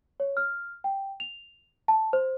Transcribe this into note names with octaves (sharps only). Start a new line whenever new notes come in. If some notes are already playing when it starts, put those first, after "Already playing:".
C#5
F6
G5
F7
A5
C5